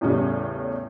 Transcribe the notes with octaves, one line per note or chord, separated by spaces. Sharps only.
E2 A2 C#3 G3 C#4